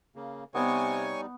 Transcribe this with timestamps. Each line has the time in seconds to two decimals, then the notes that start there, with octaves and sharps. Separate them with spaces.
0.16 C#3 A#3
0.55 C3 G3 B3 D#4 C#5 G#5 C#6